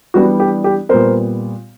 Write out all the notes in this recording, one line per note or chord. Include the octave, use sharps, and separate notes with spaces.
E3 G3 B3 D4 F#4
G4
G4
A#2 G3 B3 A#4 C5